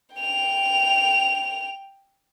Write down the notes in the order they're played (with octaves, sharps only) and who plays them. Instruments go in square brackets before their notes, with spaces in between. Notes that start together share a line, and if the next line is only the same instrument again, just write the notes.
[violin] G5 F7